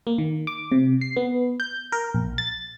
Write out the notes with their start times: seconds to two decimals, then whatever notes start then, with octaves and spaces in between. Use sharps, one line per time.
0.07 A#3
0.18 D#3
0.47 D6
0.72 C3
1.01 C7
1.16 B3
1.60 G6
1.92 A#4
2.15 A#1
2.38 A6